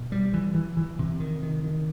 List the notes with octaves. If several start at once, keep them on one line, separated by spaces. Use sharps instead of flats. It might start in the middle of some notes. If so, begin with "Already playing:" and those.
Already playing: B2
G3
E3
E3
E3
C3
D#3
D#3
D#3